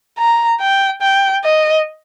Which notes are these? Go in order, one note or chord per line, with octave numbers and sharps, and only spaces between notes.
A#5
G5
G5
D#5